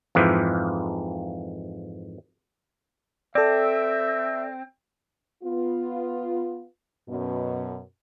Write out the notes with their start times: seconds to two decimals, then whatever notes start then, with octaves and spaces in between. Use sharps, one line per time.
0.15 F2 G#2 E3 F3
3.35 C4 A4 D5 E5
5.44 B3 F4
7.09 F#2 B2